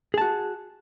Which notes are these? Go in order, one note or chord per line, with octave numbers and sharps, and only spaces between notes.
F#4 G#4 A5